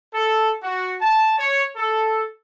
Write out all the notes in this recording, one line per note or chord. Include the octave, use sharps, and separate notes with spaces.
A4
F#4
A5
C#5
A4